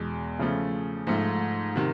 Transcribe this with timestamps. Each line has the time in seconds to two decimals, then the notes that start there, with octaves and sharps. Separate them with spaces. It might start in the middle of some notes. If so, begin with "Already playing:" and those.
Already playing: E2 B2 G#3
0.39 C#3 F3 A3
1.07 G#2 F3 A3
1.75 C3 D#3